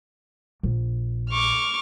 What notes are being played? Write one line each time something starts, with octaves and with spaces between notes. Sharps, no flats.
A#1
C#6 D6 F6